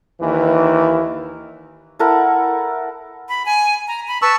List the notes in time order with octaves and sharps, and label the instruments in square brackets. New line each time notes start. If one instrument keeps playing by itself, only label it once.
[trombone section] D#2 E3
[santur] E4 A4 A#4 F#5
[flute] B5
G#5
A#5
B5
[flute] B4 [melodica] A5 C#6 E6